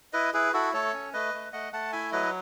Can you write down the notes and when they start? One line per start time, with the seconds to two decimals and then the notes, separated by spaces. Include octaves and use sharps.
0.13 E4 B4 D#5
0.33 E4 G#4 B4
0.53 E4 F#4 A4
0.73 A3 A4 C#5
0.93 C#4
1.13 A3 B4 D#5
1.34 A3
1.53 A3 D#5 F#5
1.73 A3 F#5 A5
1.92 E4 E5 G#5
2.12 F#3 B4 D#5